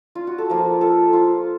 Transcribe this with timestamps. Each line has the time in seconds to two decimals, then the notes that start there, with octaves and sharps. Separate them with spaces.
0.15 F4
0.27 F#4
0.38 A4
0.50 F3 A#3 F4 A#4
0.81 A4
1.13 F4